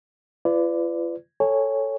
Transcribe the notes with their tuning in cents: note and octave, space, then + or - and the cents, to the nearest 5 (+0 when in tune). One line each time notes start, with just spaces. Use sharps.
F4 -40 B4 +30 D5 +0
A4 +0 C#5 +0 G#5 -20